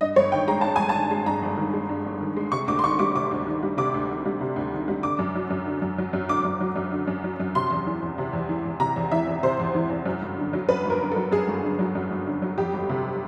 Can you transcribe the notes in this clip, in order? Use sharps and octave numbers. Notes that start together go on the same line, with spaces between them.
G2 D#5
G1 C#5
D#3 G5
G#3 A#5
G2 A5
G1 G#5
A5
D#3
G#3
G2 A#5
G1
D#3
G#3
G2
G1
D#3
G#3
C3 C#6
D2 D6
C6
D#3 C#6
G3 D6
C3 D6
D2
D#3
G3
C3 D6
D2
D#3
G3
C3
D2
D#3
G3
D3 D6
F#2
F#3
F#2
D3
F#2
F#3
F#2
D3 D6
F#2
F#3
F#2
D3
F#2
F#3
F#2
C3 C6
E2
E3
E2
C3
E2
E3
E2
C3 A#5
E2
E3 E5
E2
C3 C5
E2
E3
E2
F#2
G1
D3
F#3
F#2 B4
G1
A#4
D3
A4
F#3
F#2 G#4
G1
D3
F#3
F#2
G1
D3
F#3
F2 G4
G1
C3